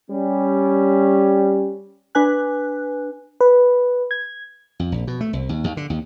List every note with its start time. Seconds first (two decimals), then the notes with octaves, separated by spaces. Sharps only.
0.10 G3 C#4
2.15 D4 B4 G#5 F#6
3.41 B4
4.11 G#6
4.79 F2
4.92 A#1
5.07 B2
5.21 A3
5.33 C2
5.49 D#2
5.64 D#2
5.77 D3
5.90 D#2